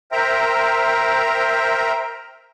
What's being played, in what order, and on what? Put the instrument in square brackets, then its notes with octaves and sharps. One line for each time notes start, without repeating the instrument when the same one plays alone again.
[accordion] A#4 C5 E5 G5 A#5